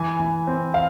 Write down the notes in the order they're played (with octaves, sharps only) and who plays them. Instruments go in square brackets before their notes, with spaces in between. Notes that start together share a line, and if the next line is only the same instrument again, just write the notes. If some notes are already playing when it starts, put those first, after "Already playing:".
Already playing: [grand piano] E3 G#5
E3
C4
F5